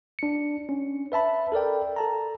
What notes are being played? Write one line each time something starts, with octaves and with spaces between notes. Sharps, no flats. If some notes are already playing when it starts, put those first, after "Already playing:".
D4 C#7
C#4
B4 E5 A5 B5
A4 A#4 D5 G5
A4 A5 A#5